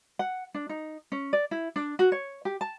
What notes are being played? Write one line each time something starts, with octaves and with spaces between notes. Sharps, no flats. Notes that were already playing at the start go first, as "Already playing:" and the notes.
F#5
D4
D#4
C#4
D5
E4
D4
F#4
C#5
G4
A5